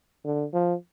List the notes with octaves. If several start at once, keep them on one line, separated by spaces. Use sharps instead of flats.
D3
F3